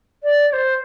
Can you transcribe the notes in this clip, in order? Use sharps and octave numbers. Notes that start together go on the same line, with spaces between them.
D5
D5
C5